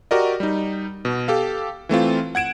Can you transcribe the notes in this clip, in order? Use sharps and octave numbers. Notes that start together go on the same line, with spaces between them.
F#4 G4 A#4 D5 D#5
G3 D#4
B2
G4 A4 F5
E3 A3 C4 F4
F#5 G#6 D7 E7